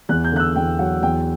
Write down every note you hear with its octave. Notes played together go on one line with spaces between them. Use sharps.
E2 F#6
G6
D3 F#6
E6
E2 G5
F#3 F#5
E2 G5